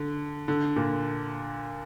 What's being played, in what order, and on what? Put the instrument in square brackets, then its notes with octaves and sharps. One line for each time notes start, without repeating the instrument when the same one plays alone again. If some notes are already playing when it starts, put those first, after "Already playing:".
Already playing: [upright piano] D3
D3
A#2